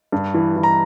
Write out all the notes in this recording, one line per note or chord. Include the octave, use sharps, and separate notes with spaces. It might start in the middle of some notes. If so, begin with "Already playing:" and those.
G2
E3
E3
A#5